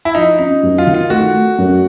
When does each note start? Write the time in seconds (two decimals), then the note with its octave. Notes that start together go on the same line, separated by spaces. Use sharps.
0.05 E4
0.15 F3 D#4
0.39 C#4 D#4
0.63 F#2
0.78 F4
0.87 D#3
0.94 F4
1.10 A3 F#4
1.34 A3
1.58 F#2